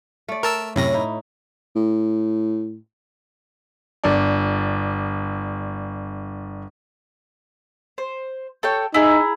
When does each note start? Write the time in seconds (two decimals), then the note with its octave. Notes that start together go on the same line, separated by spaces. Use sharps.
0.28 A3 D5
0.43 A#4 A5 E6
0.76 F#2 A2 C3 A#6
0.93 D#4 E4
1.76 A2
4.04 G1 D4
7.98 C5
8.63 A4 C#5 G5
8.94 D#4 E4 G#4 A#5